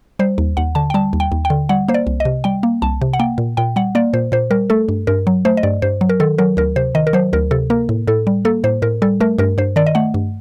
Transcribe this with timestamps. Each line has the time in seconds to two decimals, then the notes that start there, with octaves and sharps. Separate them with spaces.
0.19 G3 C5
0.38 D#2
0.57 D#2 F#5
0.75 D3 A5
0.90 G5
0.94 G3 A5
1.13 D#2
1.20 G5
1.32 D#2
1.45 G5
1.50 D3
1.69 G3 F#5
1.88 A#3 C5
1.94 D5
2.07 C2
2.20 D#5
2.25 C3
2.44 G3 G5
2.63 A#3
2.82 C2 A5
3.02 C3
3.13 F#5
3.20 A#3 G5
3.38 A#2
3.57 A#2 G5
3.76 G3 F#5
3.95 A#3 D5
4.13 A#2 C5
4.32 A#2 C5
4.51 G3 A#4
4.70 A3 A4
4.88 G2
5.07 G2 A#4
5.27 F#3
5.45 A3 C5
5.57 D#5
5.63 G2 D5
5.82 G2 C5
6.01 F#3
6.09 A#4
6.20 D#3 A4
6.38 F#3 A#4
6.57 D2 A#4
6.76 C3 C5
6.95 D#3 D#5
7.07 A#4
7.13 F#3 C5
7.33 D2 A#4
7.51 C3 A4
7.70 A#3 A#4
7.89 A2
8.07 A2 A4
8.27 G3
8.45 A#3 A4
8.64 A2 C5
8.82 A2 A#4
9.02 G3 A4
9.20 A3 A#4
9.38 G2 A#4
9.58 G2 C5
9.76 D#3 D5
9.87 D#5
9.95 A3 F#5
10.14 G2